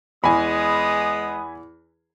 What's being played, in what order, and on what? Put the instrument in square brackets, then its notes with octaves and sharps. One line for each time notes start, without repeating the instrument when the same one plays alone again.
[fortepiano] E2 [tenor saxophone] G#3 [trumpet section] B3 D#6 [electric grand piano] G#5 B5